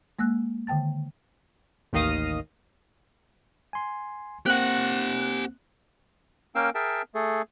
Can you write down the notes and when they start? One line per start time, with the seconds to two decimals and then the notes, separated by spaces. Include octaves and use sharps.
0.19 G#3 A#3 E6 F#6
0.67 D3 D#3 G5 A5 A6
1.93 A1 D#2 D#3 D#5 F5 D#6
3.73 G#5 C6
4.46 A#3 C4 G4 F#5 F#6
6.55 A#3 C#4 A#4 F5 G5 E6
6.75 G#4 A#4 E5 G5 A5
7.15 A3 G#4 A4